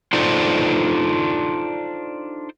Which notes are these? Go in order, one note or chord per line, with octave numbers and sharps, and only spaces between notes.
D4 D#4 F4 A4 C5 D5